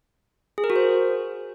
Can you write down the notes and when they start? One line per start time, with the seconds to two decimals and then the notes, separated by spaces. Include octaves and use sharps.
0.58 G#4
0.64 A#4
0.70 F#4
0.76 C5